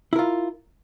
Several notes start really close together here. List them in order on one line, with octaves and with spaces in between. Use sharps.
E4 A#4 F4